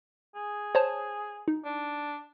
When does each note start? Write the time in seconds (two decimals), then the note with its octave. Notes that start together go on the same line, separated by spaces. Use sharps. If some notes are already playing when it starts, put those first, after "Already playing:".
0.36 G#4
0.75 C5 C#5 A5
1.48 D#4
1.65 D4